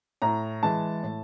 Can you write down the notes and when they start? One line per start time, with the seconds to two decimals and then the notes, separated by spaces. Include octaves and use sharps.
0.22 A2 A#5
0.63 E3 G#3 A5
1.03 A2